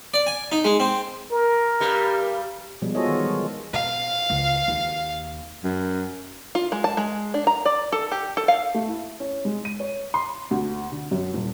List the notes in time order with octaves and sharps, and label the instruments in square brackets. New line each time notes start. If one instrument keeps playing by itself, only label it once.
[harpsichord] D5
G#5
D#4
G#3
C4
[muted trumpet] A#4
[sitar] G2 G3
[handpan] B2 F3 G3 G#3
F4 F#4 G#4 A4 C#5 D#5
D#3 E3
G3 G#3
[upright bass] B2 [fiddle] F5
[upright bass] C#2
D#2
[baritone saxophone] F#2
[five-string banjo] F4
G#3
A5
G#3
D4
A#5
D5
A4
G4
A4
F5
[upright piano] A3
E4
C#4
G#3
D#7
C#5
C6
D2
D3
F#2
D#1